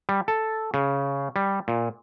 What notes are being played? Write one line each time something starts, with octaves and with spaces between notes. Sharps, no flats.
G3
A4
C#3
G3
A#2